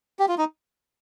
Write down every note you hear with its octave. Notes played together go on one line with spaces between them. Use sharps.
G4
F4
D#4